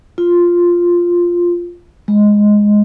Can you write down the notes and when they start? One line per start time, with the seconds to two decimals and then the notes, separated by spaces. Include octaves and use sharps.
0.18 F4
2.08 G#3